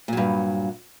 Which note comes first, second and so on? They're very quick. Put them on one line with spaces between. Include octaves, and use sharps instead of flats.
A#2 F#3 G2